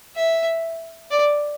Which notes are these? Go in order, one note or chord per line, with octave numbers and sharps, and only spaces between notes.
E5
D5